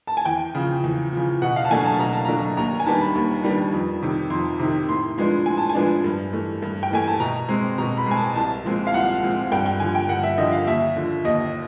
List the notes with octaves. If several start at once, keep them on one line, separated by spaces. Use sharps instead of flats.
A5
G#5
E2 G5
C#3 F3
E2
C#3 F3
B2 F#5
F5
A5
F#3 A3 D4 G#5
A5
B2 A#5
A5
F#3 A3 D4 A#5
D#2 A#5
G#5
D#3 G3 B3 D4 A5
B5
D#2
D#3 G3 B3 D4
F2
C3 D#3
F2 C6
C3 D#3
A2 C6
F3 G#3 B3 D4
A2 G#5
A5
G#5
F3 G#3 B3 D4
G2
E3 A3
G2
G5
E3 A3 G#5
A5
B2 A#5
G#3 C4
B2 A#5
B5
G#3 C4 G#5
A5
C2 A5
A#2 F3 G#3 C4
F5
C2 F#5
A#2 F3 G#3 C4
G2 G5
G5
D3 F3 G#5
G5
G2 F#5
E5
D3 F3 D#5
F5
D#2 E5
D3 F3
D#2 D#5